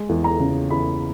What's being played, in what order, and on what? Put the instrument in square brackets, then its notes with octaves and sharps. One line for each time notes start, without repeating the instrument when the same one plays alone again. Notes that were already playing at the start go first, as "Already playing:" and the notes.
Already playing: [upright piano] G#3
E2
A#5
C#3
E2 B5